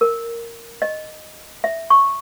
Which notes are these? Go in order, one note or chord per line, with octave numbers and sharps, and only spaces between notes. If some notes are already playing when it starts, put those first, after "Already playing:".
A#4
D#5
E5
C#6